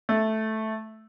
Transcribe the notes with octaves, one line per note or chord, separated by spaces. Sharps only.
A3